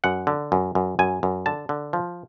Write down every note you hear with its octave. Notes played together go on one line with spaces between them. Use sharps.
F#2 F#5
D3
F#2
F#2
F#2 G#5
F#2
D3 A5
D3
F3